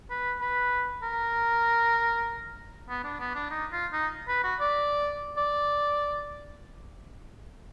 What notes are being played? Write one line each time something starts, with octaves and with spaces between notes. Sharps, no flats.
B4
B4
A#4
B3
D4
B3
D4
D#4
F4
D#4
B4
F#4
D5
D5